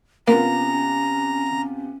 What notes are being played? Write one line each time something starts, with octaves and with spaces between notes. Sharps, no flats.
C3 A#3 B3 C#4 F4 A#5